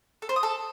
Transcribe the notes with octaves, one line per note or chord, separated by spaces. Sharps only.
A4
C5
D#6
A4